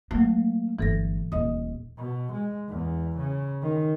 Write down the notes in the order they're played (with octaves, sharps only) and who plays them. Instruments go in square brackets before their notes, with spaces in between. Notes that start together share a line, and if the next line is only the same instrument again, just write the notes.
[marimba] F#3 A3 [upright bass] A#3
[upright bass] G1 [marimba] E3 A4 A#6
[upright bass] D#1 [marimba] D#5 D#6
[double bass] B2
G#3
E2
C#3
D#3